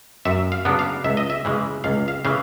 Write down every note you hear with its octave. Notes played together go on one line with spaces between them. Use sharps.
F#2 E5
F5
C#3 F#3 B3 D4
F5
C#2 E5
D#5
E5
C#3 E3 G#3
C#2 F5
F5
C#3 E3 F5